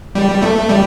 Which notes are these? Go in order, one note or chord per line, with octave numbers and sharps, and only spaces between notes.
G3
A3
G3